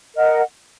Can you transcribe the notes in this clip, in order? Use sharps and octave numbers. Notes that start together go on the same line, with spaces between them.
A#4 D#5 F#5